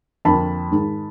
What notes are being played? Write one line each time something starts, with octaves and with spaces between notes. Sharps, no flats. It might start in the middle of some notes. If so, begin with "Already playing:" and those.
F2 D3 F3 A#3 A5 B5
G#2 D#3 G#3